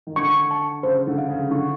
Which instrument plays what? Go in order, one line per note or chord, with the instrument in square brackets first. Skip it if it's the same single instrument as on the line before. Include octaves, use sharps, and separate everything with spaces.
[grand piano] D#3
[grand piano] D3 [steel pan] C#6
[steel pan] A5
[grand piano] C#3 [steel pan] C5
[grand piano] D3
[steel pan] F5
[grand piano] C#3
[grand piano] D3 [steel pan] C#6